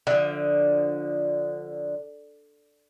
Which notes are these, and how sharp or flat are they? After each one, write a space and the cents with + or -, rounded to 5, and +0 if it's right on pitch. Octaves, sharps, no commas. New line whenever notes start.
D3 +0 F3 +25 E5 -25